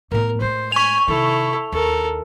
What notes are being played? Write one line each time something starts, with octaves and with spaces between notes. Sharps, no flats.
A2 B3 A#4
A2 G#3 C5
G#5 C#6 F7
C3 D#3 E4 A4
D#2 A4 A#4